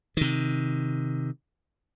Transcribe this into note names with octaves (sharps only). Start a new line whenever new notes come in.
C3 D#3